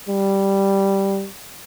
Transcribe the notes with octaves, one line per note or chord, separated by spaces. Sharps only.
G3